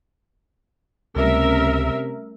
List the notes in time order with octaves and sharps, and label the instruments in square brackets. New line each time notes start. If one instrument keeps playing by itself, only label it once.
[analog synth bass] C#2 [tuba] C3 [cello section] G3 A3 C#4 [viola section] A#4 E5